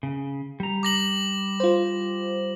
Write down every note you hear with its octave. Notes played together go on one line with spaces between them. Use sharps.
C#3
G3 A#5
D6 A#6 F#7
F4 C5